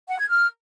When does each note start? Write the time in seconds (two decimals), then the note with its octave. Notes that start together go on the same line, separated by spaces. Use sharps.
0.08 F#5
0.18 G#6
0.29 F6